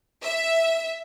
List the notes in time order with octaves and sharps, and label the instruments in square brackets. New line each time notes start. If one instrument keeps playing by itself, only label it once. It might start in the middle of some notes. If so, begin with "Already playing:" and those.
[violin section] E5